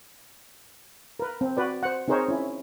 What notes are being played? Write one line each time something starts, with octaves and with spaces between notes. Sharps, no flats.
A#4 B4
C4
F#4 B4 D5
C5 F#5
C4 D#4 G#4 A#4 C5 C#5
C#4 E4